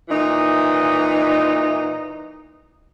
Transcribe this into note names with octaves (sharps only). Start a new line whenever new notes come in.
A#2 E3 D#4